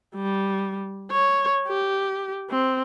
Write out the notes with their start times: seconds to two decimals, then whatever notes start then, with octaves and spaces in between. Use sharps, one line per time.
0.15 G3
1.11 C#5
1.68 G4
2.50 C4